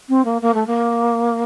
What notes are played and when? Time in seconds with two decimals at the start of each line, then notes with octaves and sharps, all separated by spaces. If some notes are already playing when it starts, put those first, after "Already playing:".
0.09 C4
0.25 A#3
0.42 A#3
0.54 A3
0.67 A#3